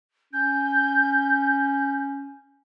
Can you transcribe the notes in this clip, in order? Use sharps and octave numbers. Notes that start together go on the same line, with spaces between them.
C#4 G6